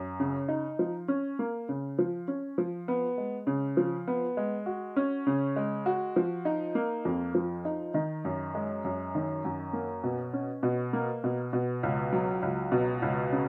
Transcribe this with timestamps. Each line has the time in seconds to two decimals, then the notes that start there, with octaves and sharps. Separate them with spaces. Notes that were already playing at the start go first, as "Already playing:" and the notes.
Already playing: F#2
0.20 C#3
0.48 D#4
0.79 F3
1.08 C#4
1.39 A#3
1.69 C#3
1.99 F3
2.28 C#4
2.58 F3
2.88 B3
3.18 G#3
3.47 C#3
3.77 F3
4.08 B3
4.37 G#3
4.66 F#4
4.96 C#4
5.27 C#3
5.56 G#3
5.86 F#4
6.16 F3
6.45 D#4
6.75 A#3
7.05 F2
7.35 F3
7.65 D#4
7.94 D#3
8.25 F#2
8.55 G#3
8.84 F#2
9.15 D#3
9.44 F#2
9.73 A#3
10.03 B2
10.33 C#4
10.63 B2
10.93 A#3
11.24 B2
11.53 B2
11.83 C#2
12.13 F#3
12.43 C#2
12.72 B2
13.02 C#2
13.32 C#3